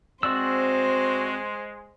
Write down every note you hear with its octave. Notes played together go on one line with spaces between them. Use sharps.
G#3 C4 F#4 C5 D5 E6